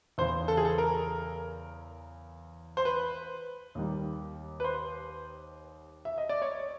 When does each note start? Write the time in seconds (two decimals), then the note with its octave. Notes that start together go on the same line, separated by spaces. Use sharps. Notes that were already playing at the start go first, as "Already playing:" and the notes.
0.18 E2 C#3 E3 C5
0.48 A4
0.57 G#4
0.65 A4
0.78 A#4
2.77 C5
2.85 B4
3.75 D#2 D#3 G3
4.60 B4
4.64 C5
6.05 E5
6.18 D#5
6.29 D5
6.42 C#5